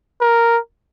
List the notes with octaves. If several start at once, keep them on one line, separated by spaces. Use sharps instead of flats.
A#4